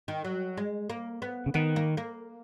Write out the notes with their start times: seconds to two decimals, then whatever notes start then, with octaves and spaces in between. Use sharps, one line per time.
0.08 D#3
0.24 F#3
0.57 G#3
0.90 A#3
1.22 B3
1.46 C#3
1.54 D#3 B3
1.76 A#3
1.97 A#3